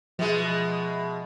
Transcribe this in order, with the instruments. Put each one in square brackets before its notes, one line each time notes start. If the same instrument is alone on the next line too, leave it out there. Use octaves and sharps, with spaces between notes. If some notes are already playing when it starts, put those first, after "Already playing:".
[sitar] B2 G#3 [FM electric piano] F3 E5